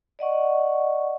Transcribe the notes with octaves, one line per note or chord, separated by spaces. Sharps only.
D5 D#5 F#5 C#6